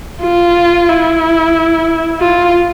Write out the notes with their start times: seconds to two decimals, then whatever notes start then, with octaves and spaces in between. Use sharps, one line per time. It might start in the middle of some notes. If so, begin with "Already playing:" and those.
0.22 F4
0.89 E4
2.20 F4